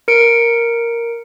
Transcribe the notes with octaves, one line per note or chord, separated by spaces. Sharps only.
A#4 C#7 D7